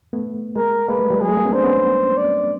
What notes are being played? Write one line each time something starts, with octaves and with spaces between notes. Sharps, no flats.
A3 B3
G#3 A#3 A#4
G#3 A#3 B4
G3 A3
F3 G3
F#3 G#3 G#4
G3 A3
G#3 A#3
B3 C#4
C4 D4 C5
B3 C#4
D5